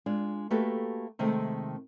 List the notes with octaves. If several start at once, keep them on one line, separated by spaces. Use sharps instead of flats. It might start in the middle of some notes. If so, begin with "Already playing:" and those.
G#3 D4 F4
A3 A#3 F#4 G4 A4 B4
C3 D#3 G#3 A3 C4